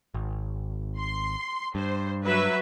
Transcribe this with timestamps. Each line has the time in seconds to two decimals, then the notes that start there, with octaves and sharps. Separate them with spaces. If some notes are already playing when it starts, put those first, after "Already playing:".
0.14 G#1
0.98 C6
1.75 G2 C5
2.25 F#3 B4 E5